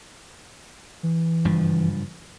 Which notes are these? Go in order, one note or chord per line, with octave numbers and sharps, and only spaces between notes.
E3
F#1 G2 F3